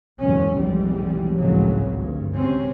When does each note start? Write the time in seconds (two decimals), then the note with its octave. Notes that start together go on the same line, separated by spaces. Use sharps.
0.19 F#1 E2 G#2 B2 C#4
0.58 F1 B1 G#2 E3 G3
1.36 G#1 C#2 A2 C#3 F3 F#3
1.93 D2 G2
2.34 G#2 C3 C4 C#4